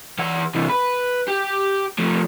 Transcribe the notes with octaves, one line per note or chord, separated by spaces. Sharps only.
E3 F#5
C3 E3
B4
G4
F3 A3